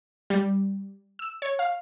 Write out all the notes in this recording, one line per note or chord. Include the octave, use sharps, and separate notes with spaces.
G3
E6
C#5
F5